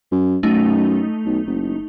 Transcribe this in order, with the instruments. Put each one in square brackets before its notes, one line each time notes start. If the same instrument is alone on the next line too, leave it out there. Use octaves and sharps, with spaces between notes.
[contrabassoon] F#2
[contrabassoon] F#2 [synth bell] A3 D#4
[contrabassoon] B1
F#1